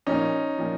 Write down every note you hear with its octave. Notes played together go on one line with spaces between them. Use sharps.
A#2 F3 C#4 D#4
A#2 F3